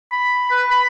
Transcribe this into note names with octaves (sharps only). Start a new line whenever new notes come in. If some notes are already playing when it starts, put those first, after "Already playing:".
B5
B4
B5